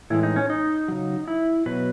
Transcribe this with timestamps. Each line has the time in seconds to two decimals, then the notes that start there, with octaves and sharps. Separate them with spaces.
0.10 A2 E3 G#3 E4
0.23 D#4
0.36 C#4
0.50 D#4
0.88 C#3 F#3
1.28 E4
1.66 B2 F#3 B4